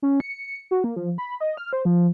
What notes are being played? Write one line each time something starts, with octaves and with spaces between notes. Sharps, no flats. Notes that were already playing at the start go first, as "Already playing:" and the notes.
C#4
C#7
F#4
A#3
F3
B5
D#5
F6
C5
F3